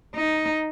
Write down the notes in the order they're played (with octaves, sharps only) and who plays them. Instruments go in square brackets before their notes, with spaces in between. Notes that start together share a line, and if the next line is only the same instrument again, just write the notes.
[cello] D#4